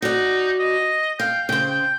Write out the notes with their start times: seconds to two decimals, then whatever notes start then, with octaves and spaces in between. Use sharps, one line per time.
0.02 D#4 F#4 D5
0.60 D#5
1.20 F5 G5
1.49 C#3 C5 G5
1.70 G5